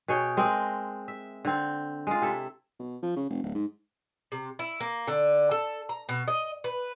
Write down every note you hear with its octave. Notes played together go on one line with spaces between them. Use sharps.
B2 G#4 C#5 G5
G#3 C4 A#4
E5
D3 C4
G#3 F4
C3 E4 A4
B2
F3
C#3
F1
D1
G#2
C3
E4
A#3
D3
A4
A#5
B2
D#5
B4